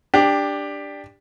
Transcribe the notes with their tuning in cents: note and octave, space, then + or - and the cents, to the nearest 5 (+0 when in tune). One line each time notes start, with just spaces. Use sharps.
D4 +0 G4 +15